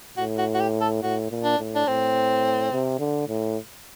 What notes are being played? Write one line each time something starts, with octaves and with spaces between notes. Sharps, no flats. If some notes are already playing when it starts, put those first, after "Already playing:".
A2 F#4
F#4
F#4
G4
A4
A2 F#4
A#2
D4
A2
D4
A2 C4
C3
D3
A2